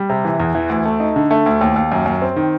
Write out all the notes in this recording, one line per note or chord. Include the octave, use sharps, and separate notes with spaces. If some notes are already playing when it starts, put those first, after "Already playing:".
Already playing: G3
C3
E3
E2
E3
D2
A3
D#4
D3
A3
D2
D#2
D#2
F#2
F#2
C4
D#3